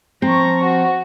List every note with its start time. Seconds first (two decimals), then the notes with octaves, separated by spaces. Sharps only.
0.22 F3 C4 A#5 C#6
0.64 F#4